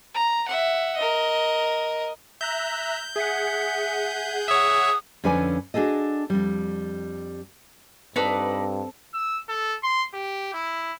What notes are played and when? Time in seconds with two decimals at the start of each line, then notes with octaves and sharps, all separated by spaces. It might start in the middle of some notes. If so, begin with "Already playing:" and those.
0.14 A#5
0.48 E5 F#5
0.96 A#4 D#5
2.41 E5 A#5 F#6 G6
3.16 G#4 E5 F#5
4.48 C#5 E5 D#6
5.24 F2 D3 C#4 B4 D5 G#5
5.74 D4 F#4 G#4 A4 D#5
6.30 F2 G3
8.16 G2 C4 D#4 A4 B4 D5
9.14 E6
9.49 A4
9.83 C6
10.14 G4
10.54 E4